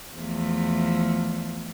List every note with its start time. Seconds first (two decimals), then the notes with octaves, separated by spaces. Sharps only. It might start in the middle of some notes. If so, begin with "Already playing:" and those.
0.17 E2 F3 A3